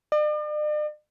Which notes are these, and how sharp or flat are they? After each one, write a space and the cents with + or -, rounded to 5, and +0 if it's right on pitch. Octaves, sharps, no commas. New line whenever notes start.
D5 +45